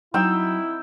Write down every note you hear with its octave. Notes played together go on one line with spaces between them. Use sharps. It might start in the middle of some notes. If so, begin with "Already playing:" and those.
F#3 C4 D#4 E4 G5 E6